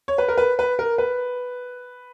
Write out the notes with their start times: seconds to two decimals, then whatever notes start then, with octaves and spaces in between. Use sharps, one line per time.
0.08 C#5
0.18 B4
0.28 A#4
0.38 B4
0.59 B4
0.79 A#4
0.98 B4